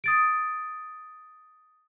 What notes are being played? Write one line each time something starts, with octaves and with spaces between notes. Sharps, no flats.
D#6 A6 D7